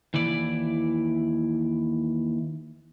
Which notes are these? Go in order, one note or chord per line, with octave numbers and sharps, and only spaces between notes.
D#2 E3 E4 D5